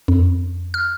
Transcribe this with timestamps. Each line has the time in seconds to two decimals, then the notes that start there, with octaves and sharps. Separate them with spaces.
0.08 F2
0.74 F6